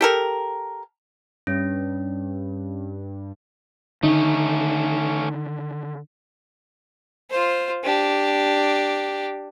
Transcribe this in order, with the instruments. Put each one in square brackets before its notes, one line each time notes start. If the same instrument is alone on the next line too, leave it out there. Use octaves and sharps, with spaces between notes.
[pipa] G4 A4 A#4
[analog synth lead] G2 [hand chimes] C#4
[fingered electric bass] D3 D#3 [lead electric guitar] A3 C#4 [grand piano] D#4
[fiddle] F4 C5
D4 G4